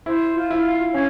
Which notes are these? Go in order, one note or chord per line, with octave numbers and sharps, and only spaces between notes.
E4 C5
F4
E4
F5
C#4 C#5